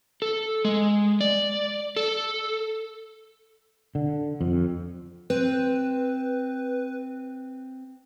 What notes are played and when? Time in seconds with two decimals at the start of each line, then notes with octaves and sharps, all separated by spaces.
0.22 A4
0.65 G#3
1.21 D5
1.96 A4
3.95 D3
4.41 F2
5.30 C4 B4